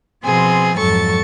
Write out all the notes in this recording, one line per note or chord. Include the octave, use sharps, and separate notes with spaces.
B2 F3 B3 C4 G#4 C6
F2 G#2 F#3 A4 C#6 A6